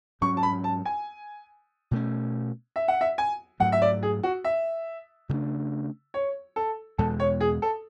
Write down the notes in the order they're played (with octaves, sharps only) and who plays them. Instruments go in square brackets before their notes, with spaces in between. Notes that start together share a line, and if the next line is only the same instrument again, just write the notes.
[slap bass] G#2 F#3 C#4 [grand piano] C#6
[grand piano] A5
B5
A5
G#5
[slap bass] B2 A3 C#4
[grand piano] E5
F#5
E5
G#5
[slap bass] G#2 F#3 A3 [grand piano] F#5
[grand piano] E5
D5
G#4
F#4
E5
[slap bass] C#3 F#3 A3 D4
[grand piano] C#5
A4
[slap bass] E2 B2 G#3 [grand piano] A4
[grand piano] C#5
G#4
A4